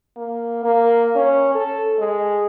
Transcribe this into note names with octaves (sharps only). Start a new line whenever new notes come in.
A#3
A#3
C#4
A4
G#3